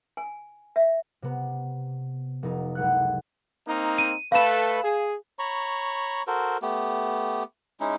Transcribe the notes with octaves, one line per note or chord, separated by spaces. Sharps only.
G#5
E5
C3 B3
F1 D#4
F#1 C#2 F#5 F#6
A#3 C4 D#4
D#7
A3 A4 B4 F5 E7
G#4
C#5 A#5 B5 C#6
F#4 A4 A#4 C5
A3 B3 G4
G#3 C#4 D#4 E4